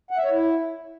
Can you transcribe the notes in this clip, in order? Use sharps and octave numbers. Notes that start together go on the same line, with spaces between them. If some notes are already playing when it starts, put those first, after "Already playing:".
F#5
E5
C#5
E4